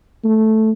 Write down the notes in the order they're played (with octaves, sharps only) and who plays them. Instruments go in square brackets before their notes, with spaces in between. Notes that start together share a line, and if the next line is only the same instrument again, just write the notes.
[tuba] A3